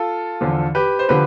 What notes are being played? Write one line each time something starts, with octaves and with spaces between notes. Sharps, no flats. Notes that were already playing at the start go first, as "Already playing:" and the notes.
Already playing: F4 A4
E2 D3 F3
G4 B4
C5
D3 F3 G4 B4